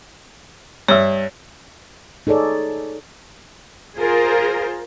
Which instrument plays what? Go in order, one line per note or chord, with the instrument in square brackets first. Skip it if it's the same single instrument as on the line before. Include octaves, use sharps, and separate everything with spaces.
[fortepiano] G2 E5 [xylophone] C#5
[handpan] D#4 G#4 A4 C#5 D5
[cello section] F4 G#4 A#4 C5